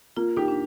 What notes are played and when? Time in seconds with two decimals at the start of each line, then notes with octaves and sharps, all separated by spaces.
0.17 A#3 F4
0.37 D#4 G4
0.48 D4